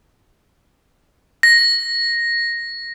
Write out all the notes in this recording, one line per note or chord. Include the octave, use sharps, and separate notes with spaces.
A#6